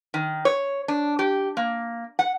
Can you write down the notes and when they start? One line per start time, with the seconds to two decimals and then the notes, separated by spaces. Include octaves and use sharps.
0.14 D#3
0.45 C#5
0.88 D4
1.19 G4
1.57 A#3
2.19 F#5